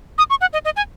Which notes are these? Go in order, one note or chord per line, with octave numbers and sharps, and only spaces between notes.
D#6
C#6
F#5
D#5
D#5
G#5